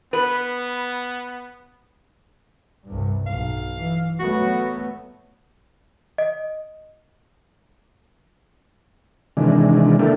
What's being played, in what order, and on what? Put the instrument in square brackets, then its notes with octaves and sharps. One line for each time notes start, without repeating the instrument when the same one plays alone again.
[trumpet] B3 [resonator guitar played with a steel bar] B4
[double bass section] C2 G2
[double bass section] B1 [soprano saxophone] F5
[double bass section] E3
[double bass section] F#3 A3 B3 [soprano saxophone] F#4
[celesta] D#5
[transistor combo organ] C3 D#3 E3 G#3 D4
A#3 D4 E4 G4 A4